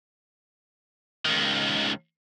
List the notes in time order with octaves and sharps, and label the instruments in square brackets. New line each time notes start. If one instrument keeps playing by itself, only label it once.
[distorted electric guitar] C#2 D#3